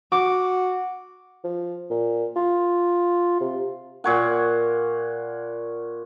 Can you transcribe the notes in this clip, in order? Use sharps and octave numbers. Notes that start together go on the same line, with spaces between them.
F#4 D6
F3
A#2
F4
C3
A#2 C#5 F#5